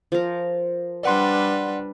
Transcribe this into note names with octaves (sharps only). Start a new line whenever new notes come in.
F3 A#4
G3 D4 B4 D5 F#5 C6